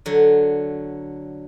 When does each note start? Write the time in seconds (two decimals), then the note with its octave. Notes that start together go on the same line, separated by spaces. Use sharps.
0.06 D3 F#3